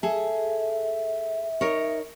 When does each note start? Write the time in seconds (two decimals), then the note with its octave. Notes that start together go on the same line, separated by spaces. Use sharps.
0.03 G#4 A4 E5
1.61 D#4 A#4 C#5